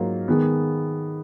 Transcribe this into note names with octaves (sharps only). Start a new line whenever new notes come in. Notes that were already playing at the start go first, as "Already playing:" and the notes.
Already playing: G#2 F#3 A#3 F4
D#3 G#3 B3